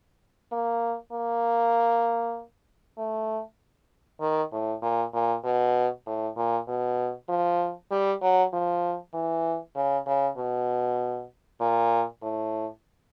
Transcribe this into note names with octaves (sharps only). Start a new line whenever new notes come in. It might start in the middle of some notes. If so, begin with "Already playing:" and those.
A#3
A#3
A3
D#3
A2
A#2
A#2
B2
A2
A#2
B2
F3
G3
F#3
F3
E3
C#3
C#3
B2
A#2
A2